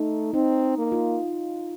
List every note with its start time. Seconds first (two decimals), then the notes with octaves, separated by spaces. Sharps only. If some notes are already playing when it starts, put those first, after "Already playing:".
Already playing: A3 D#4
0.34 C4 D#4
0.78 A#3
0.92 F4